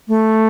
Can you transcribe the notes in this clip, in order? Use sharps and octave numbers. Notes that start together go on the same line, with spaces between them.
A3